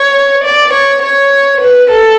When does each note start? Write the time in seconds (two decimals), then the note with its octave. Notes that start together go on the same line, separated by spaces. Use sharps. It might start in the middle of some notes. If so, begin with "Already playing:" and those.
Already playing: C#5
0.43 D5
0.72 C#5
1.01 C#5
1.60 B4
1.88 A4